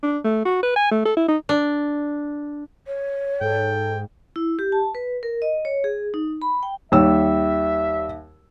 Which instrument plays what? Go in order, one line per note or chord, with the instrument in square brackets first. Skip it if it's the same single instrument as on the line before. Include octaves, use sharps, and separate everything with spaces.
[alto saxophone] D4
A3
F#4
B4
G#5
A3
A4
E4
D#4
[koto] D4
[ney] C#5
[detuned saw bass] G#2 [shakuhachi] A4 [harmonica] G5
[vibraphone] E4
G4
A5
B4
A#4
D#5
C#5
G#4
D#4
B5
G5
[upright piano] D#2 [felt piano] G3 C#5 E6 [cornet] E5